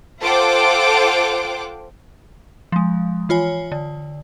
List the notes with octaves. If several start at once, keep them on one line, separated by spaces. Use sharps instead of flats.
F4 A4 C5 F#5 G5 D6
F3 G#3
E3 F4 C#5 G#5
D3